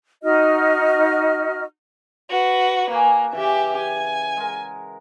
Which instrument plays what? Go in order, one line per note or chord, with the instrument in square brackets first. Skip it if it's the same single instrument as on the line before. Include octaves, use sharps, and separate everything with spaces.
[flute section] D#4 F#4 D#5 F6
[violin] F#4 B4
[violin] A#3 [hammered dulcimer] F#4 G#5 D6
[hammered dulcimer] C#3 E3 [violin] G4 E5
[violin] G#5
[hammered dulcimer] G#3 A#4